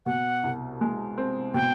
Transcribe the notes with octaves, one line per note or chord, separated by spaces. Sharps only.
B2 F#5
C2
G#3
C4
B2 G5